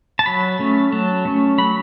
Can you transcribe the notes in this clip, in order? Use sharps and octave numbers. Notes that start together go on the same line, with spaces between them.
A5
F#3 B5
A3 C#4
F#3 A5
A3 C#4
F#3 B5